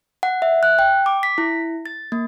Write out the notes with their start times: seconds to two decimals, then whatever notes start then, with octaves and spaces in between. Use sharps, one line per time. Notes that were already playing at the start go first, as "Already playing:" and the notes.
0.23 F#5
0.42 E5
0.63 F#6
0.79 G5
1.06 D6
1.23 B6
1.38 E4
1.86 A6
2.12 A#3